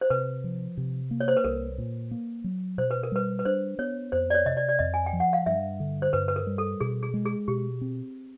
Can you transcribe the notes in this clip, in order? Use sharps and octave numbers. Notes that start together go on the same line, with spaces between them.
C5
C3 B4
F3
C3
A#3
C#5
C5
B4
C2 A#4
A#2
A#3
F#3
B2 C5
B4
A#4
G3 B4
B4
D4 C5
B3 C#5
F2 C5
D5
C#5
C3 D#5
D5
D5
F2 D#5
G#5
G5
F3
F#5
F5
G2 E5
D3
C5
G2 B4
B4
A#4
G3
A4
B2 G#4
G#4
G#3
G#4
B2 G4
C4